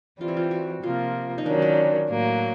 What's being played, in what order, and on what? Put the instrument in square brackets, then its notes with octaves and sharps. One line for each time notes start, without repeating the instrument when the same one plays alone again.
[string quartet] E3 G3 C4 [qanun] F4
[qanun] E4
F4
F#4
[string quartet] C3 F3 A#3 [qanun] F4
[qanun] D#4
[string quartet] D#3 F#3 A#3 C#4 [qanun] D4
[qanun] D4
[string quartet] A2 F#3 A#3